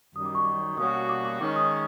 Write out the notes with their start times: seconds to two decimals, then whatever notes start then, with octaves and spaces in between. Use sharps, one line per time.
0.15 F#2 D#3 G3 D#6
0.26 D6
0.35 C#6
0.45 D6
0.77 B2 G3 A#3 C#4 F#4 D#6
1.09 D6
1.25 D6
1.40 D#3 G#3 C#4 D6
1.56 D#6